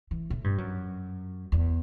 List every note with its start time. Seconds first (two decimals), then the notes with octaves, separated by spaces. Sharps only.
0.11 E3
0.30 A2
0.44 G2
0.58 F#2
1.52 E2